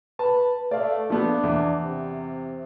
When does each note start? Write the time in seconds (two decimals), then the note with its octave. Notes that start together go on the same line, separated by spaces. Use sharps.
0.19 B4 A5
0.71 A3 D5 F5
1.10 F3 A3 B3 D4
1.43 E2
1.84 C3